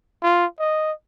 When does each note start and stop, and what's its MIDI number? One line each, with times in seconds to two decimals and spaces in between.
0.23 0.46 65
0.60 0.92 75